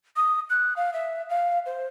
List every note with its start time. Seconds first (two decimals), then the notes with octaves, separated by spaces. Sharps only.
0.16 D#6
0.50 F#6
0.76 F5
0.93 E5
1.29 F5
1.66 C5